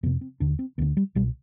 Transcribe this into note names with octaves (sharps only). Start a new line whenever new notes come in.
F2 C3 B3
C4
D#2 D3 D4
C4
D2 D3 B3
G3
C2 B2 G3